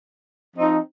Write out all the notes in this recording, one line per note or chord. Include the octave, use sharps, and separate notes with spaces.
F3 C4 D#4